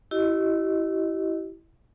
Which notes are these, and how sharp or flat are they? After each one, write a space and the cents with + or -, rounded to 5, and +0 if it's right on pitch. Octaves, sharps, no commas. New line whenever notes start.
E4 +0 G4 -35 D#5 +0